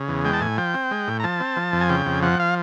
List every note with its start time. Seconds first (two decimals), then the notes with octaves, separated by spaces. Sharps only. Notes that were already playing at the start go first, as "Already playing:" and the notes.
Already playing: C#3
0.08 E2
0.25 G#3 G5
0.33 A5
0.41 A2 G#5
0.58 F3 G5
0.74 C4
0.91 G#3
1.08 A2
1.20 A#5
1.24 F3 A5
1.40 C4
1.57 F3
1.73 F2
1.81 G#5
1.89 C#3 G5
2.06 F2
2.22 F3 F#5
2.40 F5